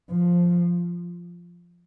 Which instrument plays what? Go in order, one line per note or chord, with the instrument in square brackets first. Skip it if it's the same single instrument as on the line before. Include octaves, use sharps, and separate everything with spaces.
[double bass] F3